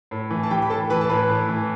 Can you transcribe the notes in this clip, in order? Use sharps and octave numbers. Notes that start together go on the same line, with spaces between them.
A2
E3
A5
E3 G4 G5
B5
A2 A4 A5
E3 B4 B5
A5
A2 B4 B5
A2
E3